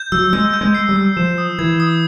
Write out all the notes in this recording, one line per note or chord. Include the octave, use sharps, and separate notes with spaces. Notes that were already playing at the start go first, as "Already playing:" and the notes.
Already playing: G6
F#3 E6
G#3 E6
G6
G#3
C7
G3
E6
F3 E7
D#6
E3 G#6
D#6